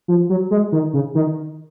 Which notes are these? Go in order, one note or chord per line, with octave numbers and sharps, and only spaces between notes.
F3
F#3
G#3
D#3
C#3
D#3